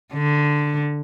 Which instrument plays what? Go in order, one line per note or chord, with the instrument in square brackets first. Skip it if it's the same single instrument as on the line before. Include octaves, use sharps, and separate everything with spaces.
[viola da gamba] D3